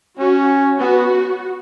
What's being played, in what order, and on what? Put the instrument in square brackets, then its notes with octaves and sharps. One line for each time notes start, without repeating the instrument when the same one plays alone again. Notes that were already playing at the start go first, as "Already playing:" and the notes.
[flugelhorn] C#4 [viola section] F#4
[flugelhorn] B3 [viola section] F#4